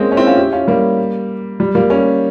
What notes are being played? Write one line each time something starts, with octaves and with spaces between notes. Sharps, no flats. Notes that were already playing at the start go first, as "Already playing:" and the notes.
Already playing: G#3 A#3 C4 C#4
C#4
C4 E4
C#4 F4
E4 G4
C#4 F4
G3 A#3
G3
G3 A#3
A#3 C#4